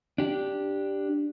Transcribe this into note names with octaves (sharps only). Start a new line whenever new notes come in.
D4 G4